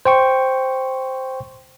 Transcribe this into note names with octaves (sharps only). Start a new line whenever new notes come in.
C5 G5 C#6